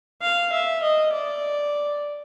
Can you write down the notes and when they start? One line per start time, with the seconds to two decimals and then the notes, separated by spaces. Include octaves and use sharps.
0.22 F5
0.53 E5
0.83 D#5
1.13 D5